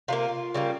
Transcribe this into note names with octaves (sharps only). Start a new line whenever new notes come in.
C3 G3 A#3 F4
C#3 G3 A#3